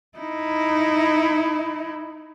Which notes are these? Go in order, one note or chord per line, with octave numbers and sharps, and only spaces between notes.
D#4 E4